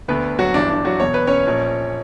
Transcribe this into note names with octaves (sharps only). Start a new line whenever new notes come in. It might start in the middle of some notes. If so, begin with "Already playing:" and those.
D2 D3 B3 B4
F#3 F#4
G1 G2 E3 D4
D4
F#3 F#4
E1 E2 B2 C#5
B4
C#4 C#5
A#1 A#2